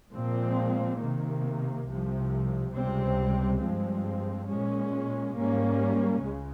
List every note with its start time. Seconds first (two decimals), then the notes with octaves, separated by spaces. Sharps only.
0.12 A#2 F3 G#3 C4
0.99 C3 D#3 A#3
1.87 C2 C3 F3
2.74 C#2 C3 G3 C4
3.60 G2 F3 G#3 C4
4.47 A#2 G#3 C#4
5.35 G#2 G3 A#3 C#4
6.21 C#2 C#3 G#3